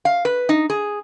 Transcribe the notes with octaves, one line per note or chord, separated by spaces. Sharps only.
F5
B4
D#4
G#4